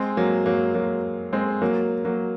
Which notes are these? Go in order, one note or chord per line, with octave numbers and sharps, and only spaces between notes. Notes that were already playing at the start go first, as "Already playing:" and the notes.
Already playing: G#3 C4
F#3 A#3
F#3 A#3
F#3 A#3
G#3 C4
F#3 A#3
F#3 A#3